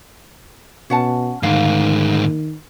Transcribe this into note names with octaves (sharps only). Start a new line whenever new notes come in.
B2 C#4 F#5 A5
D2 G#2 D#3 F5